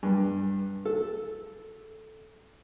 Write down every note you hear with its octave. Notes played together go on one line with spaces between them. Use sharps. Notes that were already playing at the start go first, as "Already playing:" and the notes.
G2
A4